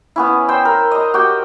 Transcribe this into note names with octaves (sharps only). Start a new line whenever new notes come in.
B3 C#4 E4
C5 G5 E6
A#4
D#5 A#5
F#4 G4 G5